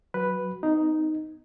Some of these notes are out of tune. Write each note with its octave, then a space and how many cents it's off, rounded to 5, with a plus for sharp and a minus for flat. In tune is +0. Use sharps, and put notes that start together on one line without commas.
F#3 +0 F#4 +0 B4 +0
B3 +45 D#4 +0